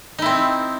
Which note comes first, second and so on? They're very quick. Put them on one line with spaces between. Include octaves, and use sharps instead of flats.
D#4 E4 C4